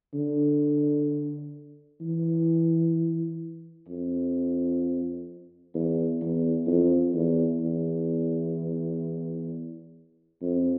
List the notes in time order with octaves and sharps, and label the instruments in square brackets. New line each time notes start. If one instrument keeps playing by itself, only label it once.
[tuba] D3
E3
F2
E2
E2
F2
E2
E2
F2